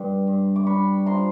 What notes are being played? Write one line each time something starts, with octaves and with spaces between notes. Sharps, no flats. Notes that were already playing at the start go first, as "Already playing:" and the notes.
Already playing: G2 G3
G2
D6
D4 B5 C#6
F3 A#5 C6